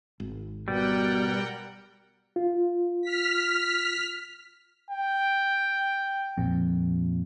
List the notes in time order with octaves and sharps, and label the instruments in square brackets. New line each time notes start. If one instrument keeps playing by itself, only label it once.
[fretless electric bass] G#1
[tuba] B2 [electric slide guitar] G3 [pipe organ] A#4 F#5 G5
[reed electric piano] F4
[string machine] F6 B6
[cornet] G5
[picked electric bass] A#1 F2